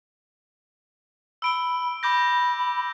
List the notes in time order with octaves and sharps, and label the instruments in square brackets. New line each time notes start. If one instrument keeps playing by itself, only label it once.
[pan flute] B5 [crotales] E6 D7 G7
[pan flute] B5 [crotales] D6 G6 A#6